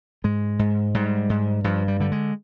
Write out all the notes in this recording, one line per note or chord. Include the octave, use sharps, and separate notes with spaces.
G#2 G#3
G#2
G#2 G3
G#2
G2 F3
G3
D3 G3
G#3